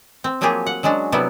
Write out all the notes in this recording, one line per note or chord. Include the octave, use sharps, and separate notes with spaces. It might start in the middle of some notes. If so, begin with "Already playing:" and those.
C4
F3 F#3 A#3 F4 G4 G#4
F#5
F#3 G#3 C#4 D4 F#4
C3 F#3 G3 B3 E4 A4